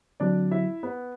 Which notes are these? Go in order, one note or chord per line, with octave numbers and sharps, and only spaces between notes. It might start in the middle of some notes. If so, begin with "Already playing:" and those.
D3 F#3 C4 D4 F#4 D5
E4 E5
B3 B4